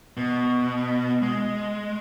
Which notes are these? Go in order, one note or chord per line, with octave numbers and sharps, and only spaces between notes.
B2
G#3